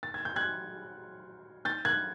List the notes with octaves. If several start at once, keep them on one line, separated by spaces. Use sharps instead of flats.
A6
G#6
G6
F#6 G#6
G6 A6
F#6 G#6